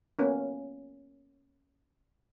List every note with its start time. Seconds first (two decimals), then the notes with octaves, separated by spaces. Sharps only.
0.19 A#3 B3 C#4